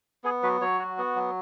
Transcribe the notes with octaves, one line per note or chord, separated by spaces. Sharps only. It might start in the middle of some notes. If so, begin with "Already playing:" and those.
B3 G#4
F#3 B4
F#3 C#5
F#4
B3
F#3